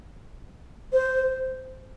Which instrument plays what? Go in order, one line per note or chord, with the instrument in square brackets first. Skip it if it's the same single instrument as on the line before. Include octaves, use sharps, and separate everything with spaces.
[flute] C5